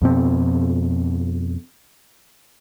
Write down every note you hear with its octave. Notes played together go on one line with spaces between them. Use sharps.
F2 B2 C4